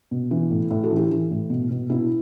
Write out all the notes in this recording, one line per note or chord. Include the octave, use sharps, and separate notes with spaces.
B2
E3
A2
A2
F#4 A4
E3
E4 G4
E3
A2
B2
B2
B2 E4